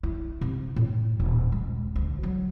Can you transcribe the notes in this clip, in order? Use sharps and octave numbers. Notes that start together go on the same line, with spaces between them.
E4
C3
A2
D#1
G#3
D2
F#3